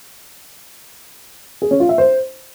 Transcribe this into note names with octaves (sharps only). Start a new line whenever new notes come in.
G#4
C#4
F4
E5
C5